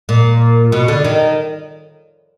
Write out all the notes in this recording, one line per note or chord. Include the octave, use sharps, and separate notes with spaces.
A#2
B2
D3
D#3